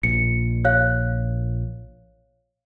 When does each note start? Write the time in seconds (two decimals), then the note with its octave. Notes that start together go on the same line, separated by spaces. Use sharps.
0.03 A#1 A#2 C#7
0.65 C#5 F5 F#6